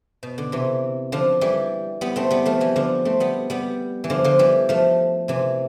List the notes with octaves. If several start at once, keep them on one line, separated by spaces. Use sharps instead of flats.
B2
D3
C3 E3
D3 F3
E3 G3
G3 B3
A3 C4
G3 B3
F3 A3
E3 G3
D3 F3
A3 C4
G3 B3
G3 B3
E3
D3 F3
D3 F3
E3 G3
F3 A3
C3 E3